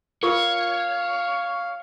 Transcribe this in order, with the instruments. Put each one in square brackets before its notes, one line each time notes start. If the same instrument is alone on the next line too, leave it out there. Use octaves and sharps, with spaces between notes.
[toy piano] F4 A#4 C#6 [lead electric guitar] C#5 [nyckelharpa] F5